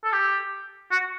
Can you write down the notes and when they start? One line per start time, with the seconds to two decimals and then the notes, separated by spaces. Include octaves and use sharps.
0.04 A4
0.12 G4
0.91 F#4